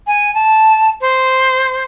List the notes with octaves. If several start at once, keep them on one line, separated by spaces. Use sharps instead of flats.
G#5
A5
C5